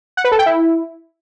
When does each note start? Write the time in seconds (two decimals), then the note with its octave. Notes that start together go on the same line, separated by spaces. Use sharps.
0.17 F#5
0.24 B4
0.32 A4
0.39 G5
0.46 E4